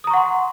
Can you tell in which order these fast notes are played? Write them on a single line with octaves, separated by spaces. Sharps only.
D#6 A#5 C#6 F#5 C6